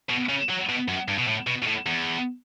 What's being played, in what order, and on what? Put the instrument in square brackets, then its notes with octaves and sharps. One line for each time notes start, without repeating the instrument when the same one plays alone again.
[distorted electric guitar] B2
C#3
F#3
B2
F#2
G2
B2
A2
B2
B2
A2
E2